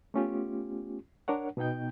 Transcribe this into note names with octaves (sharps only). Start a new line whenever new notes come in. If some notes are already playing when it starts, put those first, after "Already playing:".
A3 B3 C#4 F4 G4
D4 A#4 C#5 F#5
B2 B3 D#4 G5 G6